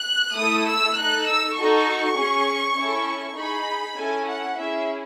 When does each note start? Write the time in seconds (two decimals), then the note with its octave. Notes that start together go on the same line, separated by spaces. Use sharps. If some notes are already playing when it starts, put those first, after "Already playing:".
Already playing: F#6
0.36 A3 E4 A4 D#6
0.67 E6
0.96 D#4 A4 F#6
1.26 E6
1.56 D#4 F#4 A4 C#6
2.17 C#4 G#4
2.76 C#4 E4 A4
3.37 D#4 G#4 B5
3.98 C#4 E4 A4 G#5
4.28 F#5
4.57 C#4 E4 G#4 E5